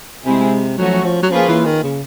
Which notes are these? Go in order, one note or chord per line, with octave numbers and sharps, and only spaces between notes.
C3 G#3 C4 E4 G#4
F3 F#3 A3 C#4 F#4
F3
F#3
F3 A#3 C#4 F4 G#4 B4
E3
D#3
C#3